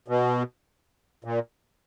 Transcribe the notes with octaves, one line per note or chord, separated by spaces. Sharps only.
B2
A#2